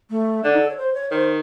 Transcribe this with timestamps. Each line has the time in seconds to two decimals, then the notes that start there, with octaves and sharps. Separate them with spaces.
0.11 A3
0.44 D3 D4
0.53 D#4
0.61 A4
0.70 C#5
0.78 C5
0.94 C#5
1.10 D#3 C5